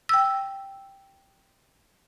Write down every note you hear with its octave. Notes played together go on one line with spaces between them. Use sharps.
G5 E6